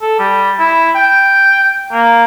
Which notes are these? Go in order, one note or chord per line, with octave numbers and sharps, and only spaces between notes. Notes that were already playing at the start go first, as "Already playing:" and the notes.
A4
G3
E4
G5
A#3